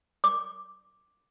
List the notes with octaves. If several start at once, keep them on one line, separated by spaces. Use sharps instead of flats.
D6